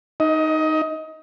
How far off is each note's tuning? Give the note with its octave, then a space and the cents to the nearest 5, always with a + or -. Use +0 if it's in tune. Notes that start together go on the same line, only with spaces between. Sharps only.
D#4 +0 D#5 +25